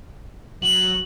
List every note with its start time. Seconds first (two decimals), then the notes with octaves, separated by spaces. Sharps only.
0.62 F#3 F#7